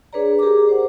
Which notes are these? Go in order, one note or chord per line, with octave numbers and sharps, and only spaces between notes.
D4 G#4 B4 C#5 D5 A#5
G4 G#4 A#4 A#5 D6
C5 F#5